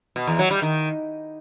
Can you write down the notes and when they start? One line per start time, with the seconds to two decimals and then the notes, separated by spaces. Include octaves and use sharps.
0.16 B2
0.27 E2
0.39 F#3
0.51 G3
0.62 D#3